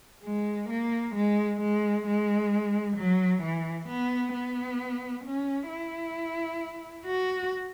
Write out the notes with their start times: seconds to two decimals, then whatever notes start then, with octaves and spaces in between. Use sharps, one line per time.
0.24 G#3
0.69 A#3
1.15 G#3
1.60 G#3
2.06 G#3
2.97 F#3
3.43 E3
3.88 B3
4.34 B3
5.25 C#4
5.69 E4
7.07 F#4